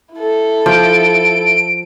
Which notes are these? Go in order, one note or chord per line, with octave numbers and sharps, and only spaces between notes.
E4 A4
F3 D7